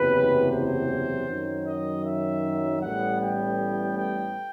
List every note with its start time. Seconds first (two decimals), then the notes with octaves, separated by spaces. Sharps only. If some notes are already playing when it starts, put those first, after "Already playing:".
Already playing: F#1 E2 C3 F#3 B4
0.50 C5
1.27 F#2 D#3 F#3
1.65 D#5
2.04 E5
2.81 A1 A2 G3 B3 F#5
3.20 G5
3.97 G5